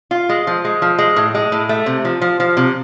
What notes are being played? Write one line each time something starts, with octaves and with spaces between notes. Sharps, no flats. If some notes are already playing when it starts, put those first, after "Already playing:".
F4
G#3
F3
G#3
F3
G#3
A2
G#3
A2
A3
C3
F3
F3
F3
C3